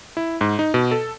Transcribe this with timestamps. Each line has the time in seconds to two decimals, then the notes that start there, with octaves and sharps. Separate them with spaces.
0.17 E4
0.41 G#2
0.59 D#4
0.74 B2
0.91 A4